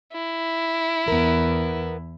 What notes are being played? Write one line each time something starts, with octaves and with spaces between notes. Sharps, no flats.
E4
E2 B3 A#4